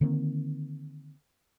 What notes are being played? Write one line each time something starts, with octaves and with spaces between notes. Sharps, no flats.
D3 D#3 A#3 C4